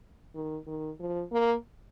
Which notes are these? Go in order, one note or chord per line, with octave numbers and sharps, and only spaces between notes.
D#3
D#3
F3
A#3